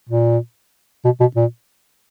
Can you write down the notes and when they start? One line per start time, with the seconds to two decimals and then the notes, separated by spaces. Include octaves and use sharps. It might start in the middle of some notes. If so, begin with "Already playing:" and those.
0.09 A#2
1.05 B2
1.20 B2
1.36 A#2